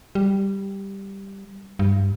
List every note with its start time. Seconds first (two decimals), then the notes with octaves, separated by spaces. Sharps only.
0.15 G3
1.79 G2